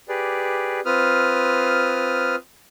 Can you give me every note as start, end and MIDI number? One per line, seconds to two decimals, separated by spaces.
0.09 0.80 67
0.09 0.80 68
0.09 0.80 71
0.09 0.80 74
0.86 2.35 60
0.86 2.35 65
0.86 2.35 71
0.86 2.35 87
0.86 2.35 89